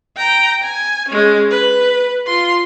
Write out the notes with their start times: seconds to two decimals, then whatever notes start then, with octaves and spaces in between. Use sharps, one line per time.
0.17 G5 A#5
0.63 G#5
1.08 G#3 C#4
1.50 B4
2.27 F4 C6